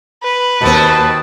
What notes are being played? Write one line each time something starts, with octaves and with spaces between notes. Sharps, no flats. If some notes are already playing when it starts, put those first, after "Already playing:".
B4
D#2 B2 C4 A5